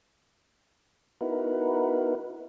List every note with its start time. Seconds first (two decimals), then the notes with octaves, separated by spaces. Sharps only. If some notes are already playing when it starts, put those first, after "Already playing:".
1.21 B3 D#4 E4 F#4 A#4 B4